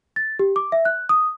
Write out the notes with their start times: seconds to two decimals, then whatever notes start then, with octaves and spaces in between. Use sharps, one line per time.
0.16 A6
0.39 G4
0.56 D6
0.72 E5
0.85 F#6
1.09 D#6